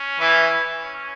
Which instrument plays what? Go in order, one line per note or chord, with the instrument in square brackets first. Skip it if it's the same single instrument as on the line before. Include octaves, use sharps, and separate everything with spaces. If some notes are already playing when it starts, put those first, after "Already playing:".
Already playing: [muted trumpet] C#4
[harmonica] E3 E4
[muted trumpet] C#4